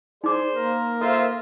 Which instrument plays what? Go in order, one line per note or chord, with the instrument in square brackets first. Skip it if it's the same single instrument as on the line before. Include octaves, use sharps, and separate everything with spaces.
[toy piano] D#4 D6 [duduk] G#4 [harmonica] C5 [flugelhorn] D5
[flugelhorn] A#3 [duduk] A#4
[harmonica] F4 C5 E5 [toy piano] A4